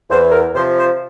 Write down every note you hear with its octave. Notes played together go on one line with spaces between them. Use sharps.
E2 C5
A#4
C3 F3 C5
C5